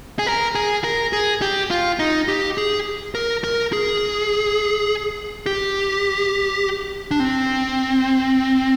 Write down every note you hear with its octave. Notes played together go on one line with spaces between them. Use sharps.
G#4
A#4
G#4
A#4
G#4
G4
F4
D#4
G4
G#4
A#4
A#4
G#4
G4
D4
C4